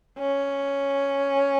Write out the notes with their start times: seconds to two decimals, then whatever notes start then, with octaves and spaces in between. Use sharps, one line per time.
0.19 C#4